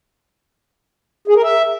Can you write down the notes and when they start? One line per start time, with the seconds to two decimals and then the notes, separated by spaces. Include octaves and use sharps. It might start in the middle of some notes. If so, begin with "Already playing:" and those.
1.28 G#4
1.35 A#4
1.43 E5